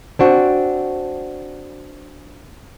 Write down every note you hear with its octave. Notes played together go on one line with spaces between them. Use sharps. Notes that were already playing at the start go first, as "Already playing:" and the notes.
C4 D4 F#4